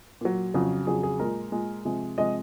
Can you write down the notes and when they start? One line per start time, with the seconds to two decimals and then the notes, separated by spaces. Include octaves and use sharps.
0.21 A#2 F#3
0.54 F2 C#3 F#3
0.87 F2 C#3 F#3 G#4
1.03 G#4
1.19 A#2 G#3 A#4
1.52 A#2 G#3
1.85 C3 F3 G#3
2.18 C3 F3 G#3 D#5